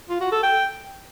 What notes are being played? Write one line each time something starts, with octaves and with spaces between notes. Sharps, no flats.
F4
F#4
A4
G5